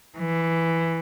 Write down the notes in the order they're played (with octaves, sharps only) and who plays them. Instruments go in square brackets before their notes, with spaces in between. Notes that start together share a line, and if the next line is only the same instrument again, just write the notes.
[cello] E3